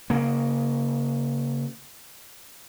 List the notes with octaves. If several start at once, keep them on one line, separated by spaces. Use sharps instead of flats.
C#3 A#3